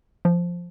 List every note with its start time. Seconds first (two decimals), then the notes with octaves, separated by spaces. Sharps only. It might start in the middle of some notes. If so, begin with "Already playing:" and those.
0.25 F3